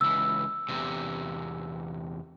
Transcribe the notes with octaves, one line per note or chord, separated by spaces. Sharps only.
C#2 E3 E6
E2 C3